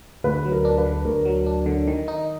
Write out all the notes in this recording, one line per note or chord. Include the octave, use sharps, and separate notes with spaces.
D2 B4
F#3
A#4
D4
B4
D3
D2 A#4
F#3
D4
D3
D#3
D#4